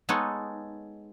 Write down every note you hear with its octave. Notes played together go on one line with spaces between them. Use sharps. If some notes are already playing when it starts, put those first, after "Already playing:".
G#3 B3 D#4 A4 C#5